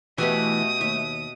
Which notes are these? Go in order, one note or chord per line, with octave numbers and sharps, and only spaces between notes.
B2 E3 A3 B3 G4 G#5 D#6
D#2 E5